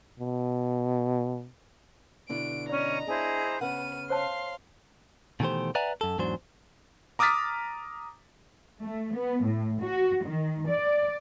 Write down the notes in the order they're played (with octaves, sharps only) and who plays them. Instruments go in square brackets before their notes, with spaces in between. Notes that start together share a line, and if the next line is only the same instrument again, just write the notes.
[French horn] B2
[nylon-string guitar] B2 D3 E4 [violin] D7
[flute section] C#4 [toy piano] D5 [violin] D#5 A#5
[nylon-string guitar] D4 [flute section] E4 G#4 C5
[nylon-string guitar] C#3 B4 F#5 [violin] B3 D#7 [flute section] F6
[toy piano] C5 C#5 A5 [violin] F5 C6
[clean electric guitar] B2 D#3 E3 A3 G4 C5
B4 D5 E5 F#5 G#5 A#5
F#2 A4
E2 G#2 F#3 D4 C5
[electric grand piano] A#5 D6 D#6 F6 A6 B6
[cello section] A3
B3
A2
F#4
D#3
D5